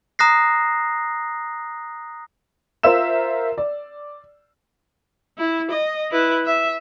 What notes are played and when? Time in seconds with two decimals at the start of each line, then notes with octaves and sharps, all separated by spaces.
0.19 A#5 D#6 F#6 A#6 C7
2.83 F4 A#4 C5 E5 E6 E7
3.58 D5
5.38 E4
5.71 D#5
6.11 E4 B4
6.46 E5